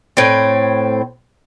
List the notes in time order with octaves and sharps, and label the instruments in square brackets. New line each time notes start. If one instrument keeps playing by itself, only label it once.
[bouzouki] A2 C4